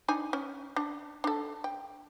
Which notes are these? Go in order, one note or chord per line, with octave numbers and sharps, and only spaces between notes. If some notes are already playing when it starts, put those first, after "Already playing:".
D4 D#4 G#5
C#4
D4
D4 A4
G5